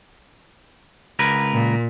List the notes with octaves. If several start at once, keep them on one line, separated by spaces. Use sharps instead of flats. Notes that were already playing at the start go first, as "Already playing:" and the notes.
C#2 A#4 B4
A#2